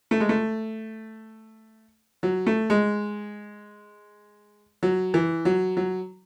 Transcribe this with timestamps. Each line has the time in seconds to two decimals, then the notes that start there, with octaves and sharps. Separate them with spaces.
0.11 A3
0.20 G#3
0.29 A3
2.23 F#3
2.46 A3
2.70 G#3
4.83 F#3
5.14 E3
5.45 F#3
5.77 F#3